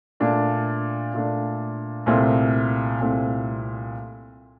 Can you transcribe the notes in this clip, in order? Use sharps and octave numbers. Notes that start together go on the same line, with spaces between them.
A#2 A3 D4
A#2 A3 D4
C2 A#2 A3 C4
C2 A#2 A3 C4